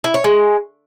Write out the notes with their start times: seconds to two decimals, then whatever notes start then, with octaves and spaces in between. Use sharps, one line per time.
0.04 E4
0.14 C#5
0.24 G#3